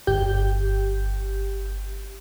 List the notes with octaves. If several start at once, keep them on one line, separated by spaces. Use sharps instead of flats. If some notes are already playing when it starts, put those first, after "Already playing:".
G1 G4 G6